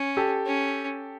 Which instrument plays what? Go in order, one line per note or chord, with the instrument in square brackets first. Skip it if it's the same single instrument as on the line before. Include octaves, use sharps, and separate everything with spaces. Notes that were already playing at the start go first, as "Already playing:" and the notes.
Already playing: [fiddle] C#4
[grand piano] G4 A4
[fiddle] C#4